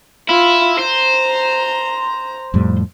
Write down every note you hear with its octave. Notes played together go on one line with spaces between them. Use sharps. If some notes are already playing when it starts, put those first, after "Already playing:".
E4 F4
C5 A#5
F2 A2 G3